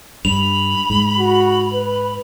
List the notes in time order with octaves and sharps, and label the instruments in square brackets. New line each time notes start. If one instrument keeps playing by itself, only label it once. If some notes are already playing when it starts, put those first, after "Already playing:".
[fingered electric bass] G2 [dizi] B5 [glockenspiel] F7
[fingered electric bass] G#2
[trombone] F#4
B4